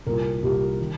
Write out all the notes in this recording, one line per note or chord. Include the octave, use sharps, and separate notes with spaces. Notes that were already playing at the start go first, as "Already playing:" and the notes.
C2 A#2 A#4
C2 A#2 G4
D#3